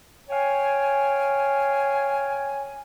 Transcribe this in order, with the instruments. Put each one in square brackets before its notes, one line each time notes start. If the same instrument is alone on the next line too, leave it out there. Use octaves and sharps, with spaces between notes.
[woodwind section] C#5 F5 G5 G#5